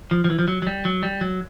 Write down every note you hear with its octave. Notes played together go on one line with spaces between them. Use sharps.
F3
F3
E3
F3
F#3
F#3
G3
F#3
G3
F#3